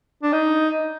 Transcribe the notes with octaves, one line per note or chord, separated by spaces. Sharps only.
D4
D#4